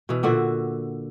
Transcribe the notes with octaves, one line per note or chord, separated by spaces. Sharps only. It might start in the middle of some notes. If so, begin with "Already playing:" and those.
B2 E3
A#2 D3 F#4 E5